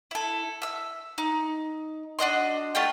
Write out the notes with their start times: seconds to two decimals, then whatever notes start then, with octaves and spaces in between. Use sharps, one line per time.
0.11 E4 A4
0.62 E5 E6
1.18 D#4
2.19 D4 F#4 D#5 C6
2.75 A3 F4 G4 G5